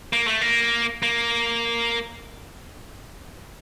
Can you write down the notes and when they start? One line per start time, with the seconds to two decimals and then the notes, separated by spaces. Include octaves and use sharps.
0.13 A#3
0.27 A3
0.41 A#3
1.03 A#3